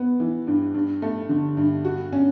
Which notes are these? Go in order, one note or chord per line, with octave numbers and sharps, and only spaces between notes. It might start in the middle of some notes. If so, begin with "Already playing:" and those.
Already playing: B3
E3
G2
G2
A3
D3
G2
F#4
C#4